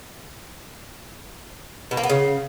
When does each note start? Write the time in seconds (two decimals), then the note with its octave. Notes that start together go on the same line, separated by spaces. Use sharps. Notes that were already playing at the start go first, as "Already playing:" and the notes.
1.91 B2
1.97 A#3
2.03 B3
2.10 C#3